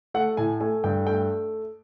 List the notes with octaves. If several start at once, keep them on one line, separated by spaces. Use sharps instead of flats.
A3 F#5
A2 G#5
A3 G#5
G2 G5
A3 G5